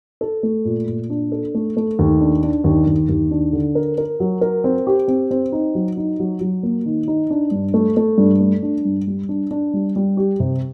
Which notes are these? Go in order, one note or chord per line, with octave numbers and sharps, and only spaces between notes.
A4
A3
A#2
A#2
D4
A4
A3
A3
D#2
D4
D4
D#2
D#2
D#2
D4
D3
A#4
A#4
F#3
A#4
C4
G4
C4
C4
D#4
F#3
D#4
F#3
F#3
A#3
D#3
D#4
D4
G2
A3
A3
G2
A3
D4
G2
G3
D4
D4
G3
G3
G4
C3